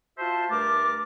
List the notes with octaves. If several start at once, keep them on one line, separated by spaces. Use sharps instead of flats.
F4 F#4 C5 E5 A5
G2 A3 A#4 A5 D6